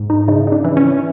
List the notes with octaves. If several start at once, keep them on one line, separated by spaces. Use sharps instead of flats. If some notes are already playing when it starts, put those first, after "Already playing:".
Already playing: G#2
D#4
C#3 D#4
D#4
D4
E3
C#4